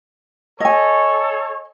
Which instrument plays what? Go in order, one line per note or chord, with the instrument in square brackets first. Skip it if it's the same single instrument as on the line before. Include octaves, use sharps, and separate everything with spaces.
[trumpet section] A4 C#5 [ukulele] D#5 G#5